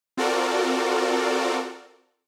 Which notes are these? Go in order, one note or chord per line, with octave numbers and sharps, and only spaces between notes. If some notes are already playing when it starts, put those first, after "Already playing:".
C4 F4 F#4 A4 A#4 D5